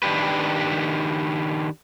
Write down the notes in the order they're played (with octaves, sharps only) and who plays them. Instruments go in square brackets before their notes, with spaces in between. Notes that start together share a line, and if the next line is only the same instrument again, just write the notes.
[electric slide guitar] D#3 D4 G4 B4